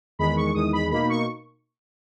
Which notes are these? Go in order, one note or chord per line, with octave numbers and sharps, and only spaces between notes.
E2 D#3 G#3 B5
C#6
E2 D#3 G#3 D#6
B5
B2 A#3 D#4 B5
C#6